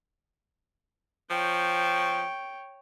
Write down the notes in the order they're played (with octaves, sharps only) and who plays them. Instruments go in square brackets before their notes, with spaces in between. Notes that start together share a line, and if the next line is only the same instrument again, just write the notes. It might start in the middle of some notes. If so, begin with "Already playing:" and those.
[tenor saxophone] F3 [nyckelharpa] C#5 G5